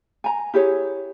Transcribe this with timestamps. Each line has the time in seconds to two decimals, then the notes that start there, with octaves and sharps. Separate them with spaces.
0.24 G#5 A#5
0.54 E4 G4 G#4 C#5